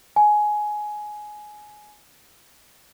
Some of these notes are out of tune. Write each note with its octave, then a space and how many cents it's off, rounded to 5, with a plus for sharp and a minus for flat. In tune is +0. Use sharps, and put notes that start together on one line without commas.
G#5 +15